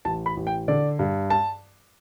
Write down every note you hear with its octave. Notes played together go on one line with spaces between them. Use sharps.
A1 A5
B5
A1
G5
D3 D5
G2
A5